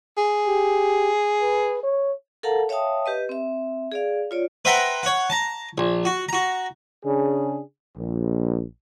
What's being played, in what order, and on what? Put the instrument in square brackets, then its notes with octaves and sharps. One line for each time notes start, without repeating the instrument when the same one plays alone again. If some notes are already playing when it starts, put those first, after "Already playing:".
[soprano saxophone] G#4
[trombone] G4
B4
C#5
[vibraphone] A4 A#4 F5 F#5 A5 A#5
C#5 E5 F5 G5 A5 D#6
G4 B4 D#5
C4 E5
G#4 D5 F5
F4 C#5 D5
[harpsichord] B4 C5 E5 F#5 G5 A#5
C#5 F#5
A5 A#5
A#1
F#4
F#4 A#5
[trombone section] C#3 D4 G#4
A#1